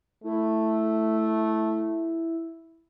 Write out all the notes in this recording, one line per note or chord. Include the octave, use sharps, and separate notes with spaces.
A3 E4